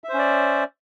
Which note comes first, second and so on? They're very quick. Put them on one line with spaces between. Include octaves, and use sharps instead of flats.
E5 C5 C#4 D5